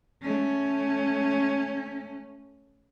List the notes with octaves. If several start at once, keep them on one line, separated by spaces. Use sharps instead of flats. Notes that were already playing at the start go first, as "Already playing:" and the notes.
A3 C#4